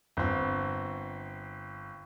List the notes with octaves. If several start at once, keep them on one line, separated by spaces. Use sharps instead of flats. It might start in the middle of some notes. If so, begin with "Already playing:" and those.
G1 C4